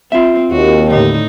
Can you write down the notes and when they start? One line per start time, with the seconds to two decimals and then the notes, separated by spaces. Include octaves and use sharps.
0.12 C4 F4 E5
0.52 D#2 F#4
0.91 A2 D3 D#4